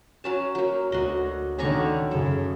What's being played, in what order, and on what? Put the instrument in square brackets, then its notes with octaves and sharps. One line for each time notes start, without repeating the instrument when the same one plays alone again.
[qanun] F#3 C#4 A5
F#3 A#3
[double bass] D2 [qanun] F#4 D#5
[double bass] D3 D#3 [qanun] C#4 A#5 C#6
[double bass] F#2 C#3 [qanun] A4